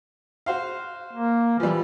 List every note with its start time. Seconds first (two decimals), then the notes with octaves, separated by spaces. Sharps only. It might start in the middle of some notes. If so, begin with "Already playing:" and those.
0.46 F#4 C5 F5
1.13 A#3
1.60 E3 F3 G3